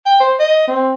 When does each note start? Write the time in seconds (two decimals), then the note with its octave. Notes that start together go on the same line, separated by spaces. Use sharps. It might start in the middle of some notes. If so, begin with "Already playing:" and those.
0.06 G5
0.20 C5
0.40 D#5
0.68 C4